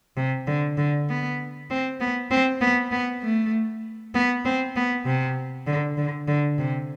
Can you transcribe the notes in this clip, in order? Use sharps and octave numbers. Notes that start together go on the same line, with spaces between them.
C3
D3
D3
B3
C4
B3
C4
B3
B3
A3
B3
C4
B3
C3
D3
D3
D3
C3